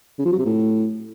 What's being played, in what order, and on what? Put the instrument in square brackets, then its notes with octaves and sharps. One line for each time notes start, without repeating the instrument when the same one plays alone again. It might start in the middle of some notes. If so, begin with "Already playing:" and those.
[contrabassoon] C#3
F3
F#3
C3
A2